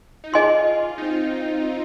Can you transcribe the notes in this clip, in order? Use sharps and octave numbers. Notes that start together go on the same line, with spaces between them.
D#4
F4 G#4 D#5 G#5 C6
D#4
C4